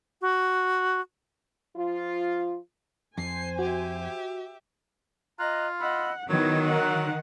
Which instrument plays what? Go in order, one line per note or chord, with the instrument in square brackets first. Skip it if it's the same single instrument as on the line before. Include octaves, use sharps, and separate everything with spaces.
[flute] F#4
[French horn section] F3 F4
[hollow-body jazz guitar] F2 [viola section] C5 G#5 [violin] C7
[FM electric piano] F#4 [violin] G4 E5
[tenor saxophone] F4 [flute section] D#5 A#5 F#6
[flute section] D#5 B5 E6 [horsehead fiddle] F#5
[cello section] D#3 [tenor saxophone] F#3 [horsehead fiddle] B3 E4 [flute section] B4 G#6
[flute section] A#4 F#6 [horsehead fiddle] F#5